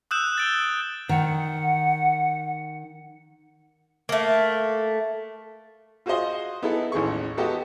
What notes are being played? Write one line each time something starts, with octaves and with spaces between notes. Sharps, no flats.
D#6 E6 F#6 G6 E7
A6 D7 G7
D#3 F#5
A3 A#3
F4 F#4 G#4 C5 D#5 C6
B3 D#4 E4 G#4 A4
A1 D#2 G#4 C#6
G#3 B3 F#4 G4 A4 D#5